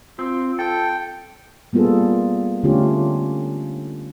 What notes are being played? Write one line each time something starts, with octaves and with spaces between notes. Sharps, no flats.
C4 F4
A4 G5
G3 A#3 B3 F4 G#4 A4
D3 A3 C#4 D4 F4 G4